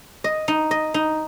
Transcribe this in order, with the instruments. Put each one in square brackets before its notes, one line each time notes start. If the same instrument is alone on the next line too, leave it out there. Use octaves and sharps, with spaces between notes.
[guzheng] D#5
D#4
D#5
D#4